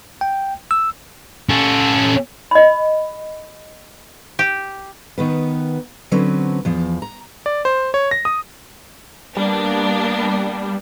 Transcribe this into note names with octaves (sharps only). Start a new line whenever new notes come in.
G5
E6
C#4 A4
D#5 B5
G4
D#3 B3 B4
D3 F#3 C4 C#4 B4
E2 F3
A#5
D5
C5
C#5
A#6
D#6
G3 A#3 B3 D4